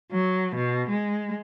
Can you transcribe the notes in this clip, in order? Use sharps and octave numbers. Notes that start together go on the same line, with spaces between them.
F#3
B2
G#3